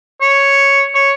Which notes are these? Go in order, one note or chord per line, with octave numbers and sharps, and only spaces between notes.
C#5
C#5